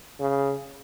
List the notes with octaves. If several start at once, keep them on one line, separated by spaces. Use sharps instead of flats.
C#3